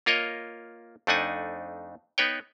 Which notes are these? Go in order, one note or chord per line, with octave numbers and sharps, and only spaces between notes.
A#3 F4 A#4 C#5 D#5
F2 A3 D4 D#4 F#5 G#5
B3 D#4 B4 C#5 G5